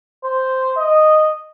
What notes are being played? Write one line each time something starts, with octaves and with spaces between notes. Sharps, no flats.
C5
D#5